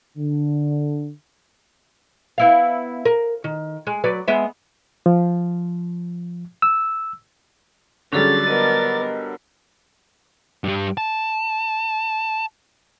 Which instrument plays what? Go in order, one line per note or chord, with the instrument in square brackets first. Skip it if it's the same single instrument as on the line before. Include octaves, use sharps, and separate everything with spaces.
[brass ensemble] D3
[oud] B3 E4 F5
A#4
D#3
G#3
F#3 B4 D5
G#3 B3 E5
[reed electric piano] F3
E6
[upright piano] D3 F#3 G3 [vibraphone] C#4 G#4 A4 [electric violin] D5 A6
[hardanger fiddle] B3 A#4 [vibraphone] D#5
[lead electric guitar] G2 G3
A5